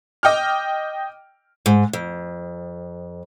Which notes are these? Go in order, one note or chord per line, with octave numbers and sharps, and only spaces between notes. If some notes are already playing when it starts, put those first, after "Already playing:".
D#5 G5 D6 F6
G#2
F2